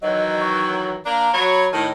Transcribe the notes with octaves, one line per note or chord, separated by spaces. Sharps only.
D#3 E3 F#3 D#5
C#6
A#3 D4 A#5
F#3 C#5 B5
A2 D#3 A5